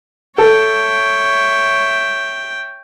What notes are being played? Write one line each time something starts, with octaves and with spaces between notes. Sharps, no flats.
A4 C#5 E5 G5